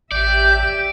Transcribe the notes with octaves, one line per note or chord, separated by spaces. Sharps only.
A1 G4 D5 E5 G6